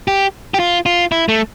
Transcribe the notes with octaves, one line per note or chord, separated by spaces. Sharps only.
G4
G4
F4
F4
E4
A3